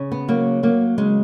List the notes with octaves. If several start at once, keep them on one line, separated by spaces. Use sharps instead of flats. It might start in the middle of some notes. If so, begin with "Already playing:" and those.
Already playing: C#3
B3
F#3 A#3
F#3 A#3
C#3 G#3